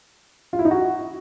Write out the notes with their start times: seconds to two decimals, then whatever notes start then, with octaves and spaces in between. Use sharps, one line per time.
0.53 F4
0.59 E4
0.65 D#4
0.71 F#4